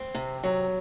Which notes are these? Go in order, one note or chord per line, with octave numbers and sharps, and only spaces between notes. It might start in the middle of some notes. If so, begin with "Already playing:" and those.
Already playing: C4
C3
F#3